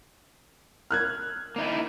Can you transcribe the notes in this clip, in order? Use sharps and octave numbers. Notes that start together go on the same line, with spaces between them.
F6 F#6 G#6
A#3 D#4 E4